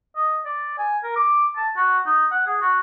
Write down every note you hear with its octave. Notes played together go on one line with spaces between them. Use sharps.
D#5
D5
G#5
A#4
D6
A5
F#4
D#4
F#5
G#4
F#4